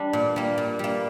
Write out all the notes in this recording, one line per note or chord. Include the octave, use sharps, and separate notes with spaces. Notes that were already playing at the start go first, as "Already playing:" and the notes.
Already playing: G3 D4
A#2
G3 A#3
A#2
G3 A#3